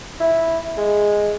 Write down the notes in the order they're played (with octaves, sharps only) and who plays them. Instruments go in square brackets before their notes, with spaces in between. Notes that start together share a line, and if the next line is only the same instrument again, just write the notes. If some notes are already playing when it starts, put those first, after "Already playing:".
[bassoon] E4
G#3